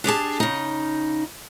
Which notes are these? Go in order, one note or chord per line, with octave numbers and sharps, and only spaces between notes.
D4 G4 G#4 A5
C#3 D#4